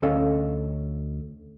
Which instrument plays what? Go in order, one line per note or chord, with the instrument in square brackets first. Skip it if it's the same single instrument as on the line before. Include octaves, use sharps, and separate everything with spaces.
[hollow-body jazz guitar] D2 C#4 A4 D#5 F5